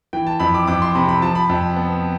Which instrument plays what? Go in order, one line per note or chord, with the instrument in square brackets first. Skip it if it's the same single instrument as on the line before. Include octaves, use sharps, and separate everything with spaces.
[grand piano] E3 G5
A5
F2 B5
D6
F2 D6
C6
C3 B5
B5
F3 A5
B5
F2
B3